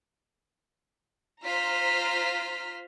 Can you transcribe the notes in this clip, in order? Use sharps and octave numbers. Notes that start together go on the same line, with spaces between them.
F4 C5 A#5 F6 B6